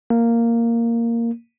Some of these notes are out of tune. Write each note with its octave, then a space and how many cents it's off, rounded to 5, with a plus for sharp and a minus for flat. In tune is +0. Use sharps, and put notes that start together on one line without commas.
A#3 -5